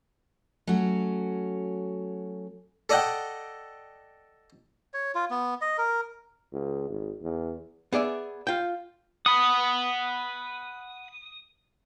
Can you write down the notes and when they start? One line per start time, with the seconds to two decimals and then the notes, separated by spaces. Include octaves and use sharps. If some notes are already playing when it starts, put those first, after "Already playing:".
0.67 F#3 A3 C#4 F#4
2.89 A4 D5 D#5 F#5 G5
4.94 C#5
5.15 F4
5.31 B3
5.61 D#5
5.78 A#4
6.53 C#2
6.90 G#1
7.22 E2
7.92 B3 G#4 D5 E5
8.47 F4 G5
9.26 F#5 B5 D#6